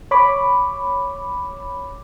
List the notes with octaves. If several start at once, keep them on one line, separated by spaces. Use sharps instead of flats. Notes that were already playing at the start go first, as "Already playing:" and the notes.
C#5 B5 D6